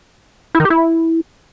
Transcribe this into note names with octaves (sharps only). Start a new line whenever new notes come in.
E4
D#3
G4
E4